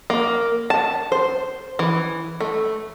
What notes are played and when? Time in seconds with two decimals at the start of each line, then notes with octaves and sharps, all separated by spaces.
0.10 A#3
0.70 A5
1.12 C5
1.79 E3
2.41 A3